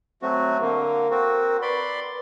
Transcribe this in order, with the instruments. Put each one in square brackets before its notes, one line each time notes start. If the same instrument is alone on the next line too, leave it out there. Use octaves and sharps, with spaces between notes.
[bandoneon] F#3 A3 F#4 [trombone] C4
[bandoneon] D3 A#3 [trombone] A#4
[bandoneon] C4 F#4
[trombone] B4 [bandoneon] D5 B5 C6